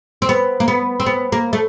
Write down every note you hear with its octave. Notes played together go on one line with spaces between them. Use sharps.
C4
B3
A#3
B3
C4
B3
A#3
A3